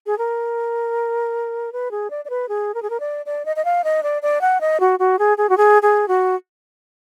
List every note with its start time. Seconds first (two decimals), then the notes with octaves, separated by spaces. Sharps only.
0.06 G#4
0.18 A#4
1.73 B4
1.91 G#4
2.10 D5
2.25 D5
2.30 B4
2.49 G#4
2.74 A#4
2.83 G#4
2.90 A#4
3.00 D5
3.26 D5
3.45 D#5
3.56 D#5
3.65 F5
3.84 D#5
4.03 D5
4.22 D5
4.41 F#5
4.61 D#5
4.80 F#4
4.99 F#4
5.19 G#4
5.38 G#4
5.49 F#4
5.57 G#4
5.82 G#4
6.08 F#4